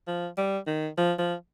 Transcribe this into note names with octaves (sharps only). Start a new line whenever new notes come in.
F3
G3
D#3
F3
F3